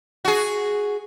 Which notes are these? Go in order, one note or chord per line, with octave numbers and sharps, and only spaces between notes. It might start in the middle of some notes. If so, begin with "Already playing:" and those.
F#4 G#4